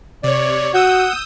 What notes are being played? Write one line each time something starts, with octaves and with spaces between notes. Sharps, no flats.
C3 C#5 D5
F#4 F#5 D#6 E6 G6